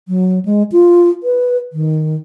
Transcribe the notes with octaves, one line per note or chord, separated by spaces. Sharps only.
F#3
G#3
F4
B4
D#3